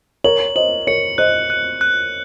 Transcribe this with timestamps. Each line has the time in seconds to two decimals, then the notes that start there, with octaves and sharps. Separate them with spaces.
0.24 A#4 C#5 F#7
0.55 C5 D#5 F#7
0.87 A#4 C#5 C#7
1.18 C5 D#5 F#6
1.50 F#6
1.81 F#6